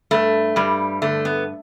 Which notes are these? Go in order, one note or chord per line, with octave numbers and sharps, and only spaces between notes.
G2 A3
G2 G3
D3 A3
B3